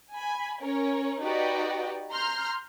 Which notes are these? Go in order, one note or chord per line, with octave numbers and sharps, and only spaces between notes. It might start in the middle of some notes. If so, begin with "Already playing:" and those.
G#5 B5
C#4 A#4 C#5
D#4 F#4 G4 B4 D5 D#5
A#5 C6 F6 G6